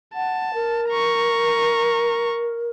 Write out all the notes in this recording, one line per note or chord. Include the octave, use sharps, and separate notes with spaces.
F#5 A5
A#4
A#5 C#6